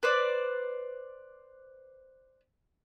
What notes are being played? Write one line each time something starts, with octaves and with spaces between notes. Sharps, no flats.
B4 C5 D5